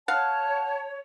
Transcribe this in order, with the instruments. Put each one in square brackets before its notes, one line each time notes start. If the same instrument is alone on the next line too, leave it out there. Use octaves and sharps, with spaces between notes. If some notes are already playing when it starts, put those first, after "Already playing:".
[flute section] C#5 [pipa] F5 [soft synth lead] F#5 [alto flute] A5